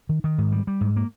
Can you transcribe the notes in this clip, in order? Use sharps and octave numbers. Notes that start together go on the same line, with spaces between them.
D#3
D#3
G#2
G3
G3
G#2
A#3